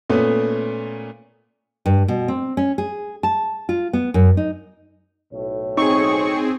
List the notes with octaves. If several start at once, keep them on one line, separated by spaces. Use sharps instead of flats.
A#2 A3 B3 C#4
G2
B2
C4
C#4
G#4
A5
F4
B3
F#2
D#4
B1 A2 C#5
C4 D#4 G#4 C#6